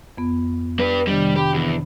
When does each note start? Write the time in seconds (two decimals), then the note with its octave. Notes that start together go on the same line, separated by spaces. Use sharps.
0.17 F2 B3
0.79 D4 B4
1.07 C3 D#3 G3 D4
1.36 G4 B5
1.54 E2